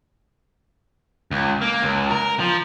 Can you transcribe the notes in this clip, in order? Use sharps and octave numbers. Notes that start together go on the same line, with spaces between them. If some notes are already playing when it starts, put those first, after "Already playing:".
C#2
A#3
C#2
A#4
F3